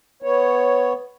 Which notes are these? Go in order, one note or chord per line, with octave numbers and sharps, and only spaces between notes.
B3 C#5